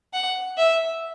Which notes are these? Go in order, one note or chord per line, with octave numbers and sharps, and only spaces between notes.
F#5
E5